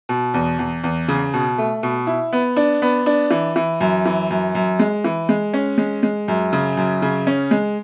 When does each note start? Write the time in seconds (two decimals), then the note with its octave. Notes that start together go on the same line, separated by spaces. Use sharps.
0.09 B2
0.34 E2
0.59 E2
0.84 E2
1.08 C#3
1.33 B2
1.58 A3
1.83 B2
2.07 E4
2.33 B3
2.56 D4
2.82 B3
3.06 D4
3.31 E3
3.56 E3
3.80 F#2
4.06 E3
4.30 F#2
4.55 F#2
4.79 G#3
5.04 E3
5.29 G#3
5.54 C#4
5.78 G#3
6.03 G#3
6.28 F#2
6.53 C#3
6.77 F#2
7.02 C#3
7.27 C#4
7.51 G#3